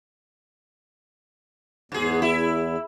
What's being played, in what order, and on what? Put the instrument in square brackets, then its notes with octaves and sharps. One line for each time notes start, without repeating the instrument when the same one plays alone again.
[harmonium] E2 [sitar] G#2 G#4
[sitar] E4